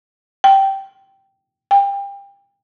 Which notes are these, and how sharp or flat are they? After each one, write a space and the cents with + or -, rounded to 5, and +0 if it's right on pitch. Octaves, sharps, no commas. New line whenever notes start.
G5 -10
G5 +30